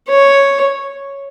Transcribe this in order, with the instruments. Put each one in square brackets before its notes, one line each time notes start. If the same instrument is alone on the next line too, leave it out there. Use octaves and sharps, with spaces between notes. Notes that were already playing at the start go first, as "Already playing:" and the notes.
[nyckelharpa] C#5